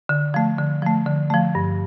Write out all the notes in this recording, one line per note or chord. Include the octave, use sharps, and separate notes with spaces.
D3
F3 A3
D3
F3 A3
D3
F3 A3
G2